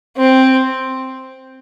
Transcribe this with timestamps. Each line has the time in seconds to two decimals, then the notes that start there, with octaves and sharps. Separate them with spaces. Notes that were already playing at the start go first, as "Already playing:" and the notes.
0.17 C4